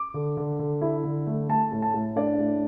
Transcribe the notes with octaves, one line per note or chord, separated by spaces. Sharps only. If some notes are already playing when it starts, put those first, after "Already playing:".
Already playing: D6
D3
D3
D3
E4
D3
A3
A3 A5
A2
A5
A2
D4 D5
A2